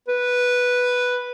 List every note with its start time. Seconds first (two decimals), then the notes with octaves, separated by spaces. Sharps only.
0.08 B4